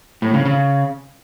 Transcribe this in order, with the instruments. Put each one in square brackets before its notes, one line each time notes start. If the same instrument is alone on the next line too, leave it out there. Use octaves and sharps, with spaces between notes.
[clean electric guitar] A2
C#3
C#3